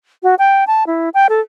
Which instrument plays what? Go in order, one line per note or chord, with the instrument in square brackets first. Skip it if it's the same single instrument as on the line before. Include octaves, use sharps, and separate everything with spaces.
[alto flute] F#4
G5
A5
E4
G5
A4